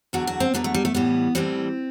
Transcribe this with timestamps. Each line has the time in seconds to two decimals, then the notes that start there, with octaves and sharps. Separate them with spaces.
0.13 E2 D3 F#3 F#4
0.27 F#4
0.40 C4
0.54 E2 D3 F#3 B3
0.64 A3
0.74 G3
0.85 A3
0.94 A2 E3 G3 B3
1.35 A2 E3 G3 C4